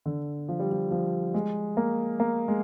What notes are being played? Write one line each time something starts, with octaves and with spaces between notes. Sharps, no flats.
D3
F3
G3
F3
F3
G#3
A#3
A#3
G#3